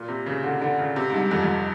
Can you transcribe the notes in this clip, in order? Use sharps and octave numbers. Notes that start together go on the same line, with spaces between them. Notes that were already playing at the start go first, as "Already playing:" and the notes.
Already playing: A#2
C3
C#3
D3
D3
C#3
C3
G#2
G2
F2
F2